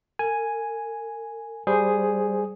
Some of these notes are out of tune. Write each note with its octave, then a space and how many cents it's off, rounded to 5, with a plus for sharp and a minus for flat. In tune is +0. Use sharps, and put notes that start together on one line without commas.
A#4 -40 G#5 +0
G3 +0 G#4 +0 C5 +0